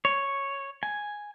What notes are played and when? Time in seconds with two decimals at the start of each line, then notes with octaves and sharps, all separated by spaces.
0.05 C#5
0.83 G#5